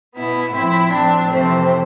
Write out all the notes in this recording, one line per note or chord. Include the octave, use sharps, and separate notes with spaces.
B2 B3 E4
A2 F3 C4 E4
A2 F3 C4 D4
F2 C3 E3 A3 C4 C5